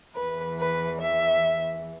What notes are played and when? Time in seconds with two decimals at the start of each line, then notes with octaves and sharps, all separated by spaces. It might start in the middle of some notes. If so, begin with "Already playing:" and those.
0.15 E2 E3 B4
0.59 B4
1.00 E5